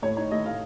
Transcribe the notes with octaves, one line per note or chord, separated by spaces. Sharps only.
A2 C#5
D#4 C#5
A3 D#5
A2 F5